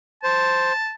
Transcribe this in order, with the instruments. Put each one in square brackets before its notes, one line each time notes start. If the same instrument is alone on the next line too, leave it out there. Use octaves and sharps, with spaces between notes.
[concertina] C5 [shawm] A5